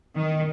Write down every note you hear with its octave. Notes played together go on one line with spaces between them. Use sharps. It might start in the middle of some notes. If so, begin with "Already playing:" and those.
D#3